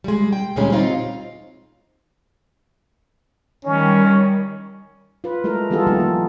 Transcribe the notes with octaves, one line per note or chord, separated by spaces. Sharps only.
G3 G#3
G5
D2 A#2 G3 G#3 C#4
C4 D#4 F4
D#3 G3 C#4
F4 B4
G#3 A3 E4 A#4
E3 G3 B3 F4 G#4 A4
D#3 F3 A3 A#3 D#4 F4
A#3 F4